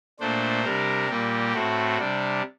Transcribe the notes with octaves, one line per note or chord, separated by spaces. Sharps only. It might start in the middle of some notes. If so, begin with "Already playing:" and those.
A#2 A3 D4 C5
C3 G3 D4 A#4
A#2 G3 A#3 G4
A2 A3 C4 F#4
C3 G3 D4